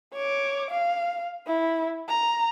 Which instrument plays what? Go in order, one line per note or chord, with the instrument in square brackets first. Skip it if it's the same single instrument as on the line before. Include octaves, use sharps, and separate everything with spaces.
[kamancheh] C#5 D6
F5
E4
A#5